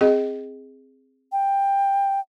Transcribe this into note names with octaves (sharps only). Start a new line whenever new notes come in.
C4 G#4 D#5
G5